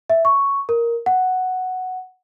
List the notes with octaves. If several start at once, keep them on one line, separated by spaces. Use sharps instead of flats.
E5
C#6
A#4
F#5